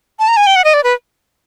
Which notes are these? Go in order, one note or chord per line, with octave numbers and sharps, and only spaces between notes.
A5
A#5
G#5
G5
F#5
D#5
D5
B4